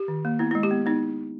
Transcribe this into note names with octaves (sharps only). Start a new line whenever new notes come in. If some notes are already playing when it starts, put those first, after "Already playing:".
Already playing: G4
D#3
A#3
B3 E4
G#3 E4
G4
B3
B3 D#4